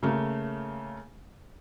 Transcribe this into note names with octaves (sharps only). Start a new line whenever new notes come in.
C#3 A3 A#3